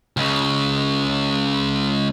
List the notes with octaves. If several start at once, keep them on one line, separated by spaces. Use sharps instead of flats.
C#2 C#3